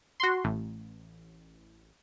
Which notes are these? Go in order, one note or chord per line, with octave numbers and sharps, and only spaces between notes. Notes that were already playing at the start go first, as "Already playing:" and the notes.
F#4 C6
A1